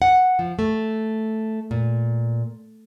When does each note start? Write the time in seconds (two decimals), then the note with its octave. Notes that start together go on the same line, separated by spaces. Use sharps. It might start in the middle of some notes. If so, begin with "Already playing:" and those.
0.02 F#5
0.39 F3
0.59 A3
1.71 A#2